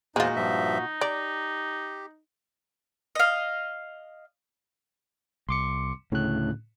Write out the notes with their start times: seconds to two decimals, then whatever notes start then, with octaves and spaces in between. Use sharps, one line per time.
0.16 E2 A#2 G#3 D#4 F4 F#4 C5
0.36 G2 F3 E5
1.01 G4 D5 A#5
3.15 D#5 F5
5.49 C2 C6 D6 C#7
6.12 D2 A2 C#3 F#6